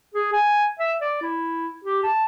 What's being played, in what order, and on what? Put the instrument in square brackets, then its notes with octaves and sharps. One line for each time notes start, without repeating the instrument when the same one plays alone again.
[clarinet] G#4
G#5
E5
D5
E4
G4
A5